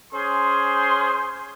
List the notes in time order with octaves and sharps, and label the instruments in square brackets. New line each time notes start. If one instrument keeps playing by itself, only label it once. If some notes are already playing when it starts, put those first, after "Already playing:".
[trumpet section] C#4 G#4 C5 C6